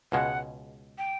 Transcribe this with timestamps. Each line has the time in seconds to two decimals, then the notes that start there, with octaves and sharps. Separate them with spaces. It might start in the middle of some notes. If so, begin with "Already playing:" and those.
0.12 C#2 B2 G#3 F#5
0.98 G5